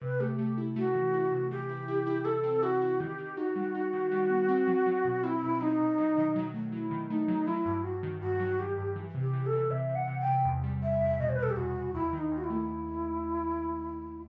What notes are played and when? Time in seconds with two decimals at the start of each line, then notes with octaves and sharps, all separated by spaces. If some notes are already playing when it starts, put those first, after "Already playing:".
0.02 C3 B4
0.20 A3 G4
0.38 A3 G4
0.58 E4
0.76 A3 F#4
0.95 E3
1.14 E4
1.32 C3
1.51 E3 G4
1.69 E4
1.88 E4
2.07 E4
2.25 E4 A4
2.43 C4
2.63 E4 F#4
2.81 E4
3.00 D#3 G4
3.18 D#3
3.37 D#4 F#4
3.56 G3
3.75 D#4
3.93 D#3
4.11 G3
4.30 B3
4.48 C4
4.67 F#3
4.86 F#3
5.05 B2
5.23 C4 E4
5.43 B2
5.61 F#3 D#4
5.80 B2
5.98 F#3
6.17 D#3
6.36 F#3
6.54 A3
6.72 F#3 E4
6.91 D#3
7.10 A3 D#4
7.28 F#3
7.47 F#3 E4
7.65 G2
7.84 G2 F#4
8.03 D#3
8.21 G2 F#4
8.40 F#3
8.59 D#3 G4
8.77 G2
8.96 E3
9.14 C3
9.21 G4
9.33 E3
9.46 A4
9.53 E3
9.70 C3 E5
9.89 C3
9.95 F#5
10.08 C3
10.20 G5
10.26 C3
10.45 E2
10.63 G3
10.83 E2 E5
11.01 E2
11.20 B2 D#5
11.29 C5
11.35 B4
11.38 B2 A4
11.50 G4
11.57 E2 F#4
11.76 E2
11.94 D#2 E4
12.13 D#3
12.18 D#4
12.31 D#2
12.37 F#4
12.44 E4
12.50 A3